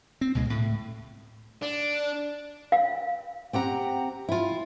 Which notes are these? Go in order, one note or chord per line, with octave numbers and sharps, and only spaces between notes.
C4
C#2 B2 G#3
A2
D4
F5
C4 G4 F#5 A#5
E4 F4